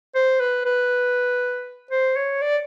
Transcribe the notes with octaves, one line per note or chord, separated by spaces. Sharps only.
C5
B4
B4
C5
C#5
D5